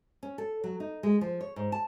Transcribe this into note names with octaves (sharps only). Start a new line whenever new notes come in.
C#4
A4
F#3
D#4
G#3
F3
C#5
G#2
A5